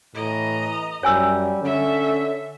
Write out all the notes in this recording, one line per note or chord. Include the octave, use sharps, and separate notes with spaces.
A2 E3 D#5 A#5
F#2 G3 C#5 G#5 E6
D3 C#4 A4 E5